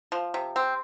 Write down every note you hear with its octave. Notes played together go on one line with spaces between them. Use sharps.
F3
C3
C4